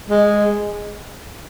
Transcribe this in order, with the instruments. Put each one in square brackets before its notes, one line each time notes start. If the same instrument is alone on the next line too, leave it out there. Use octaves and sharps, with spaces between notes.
[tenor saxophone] G#3